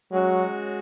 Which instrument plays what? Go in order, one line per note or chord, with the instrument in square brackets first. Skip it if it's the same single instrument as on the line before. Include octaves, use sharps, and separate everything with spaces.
[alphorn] F#3 [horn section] G#3 C#4 F#4